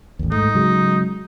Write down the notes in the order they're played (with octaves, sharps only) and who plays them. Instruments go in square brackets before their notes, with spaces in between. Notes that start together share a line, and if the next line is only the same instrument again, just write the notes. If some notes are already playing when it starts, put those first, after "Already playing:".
[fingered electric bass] A1 D#2
[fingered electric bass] G#2 A3 [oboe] D#4
[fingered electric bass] C#3 F#3 G#3